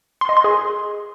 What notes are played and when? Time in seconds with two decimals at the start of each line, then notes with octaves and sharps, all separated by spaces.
0.21 C6
0.29 D#5
0.37 C6
0.44 G#4